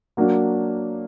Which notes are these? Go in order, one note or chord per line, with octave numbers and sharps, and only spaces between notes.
F#3 A#3 D4 F#4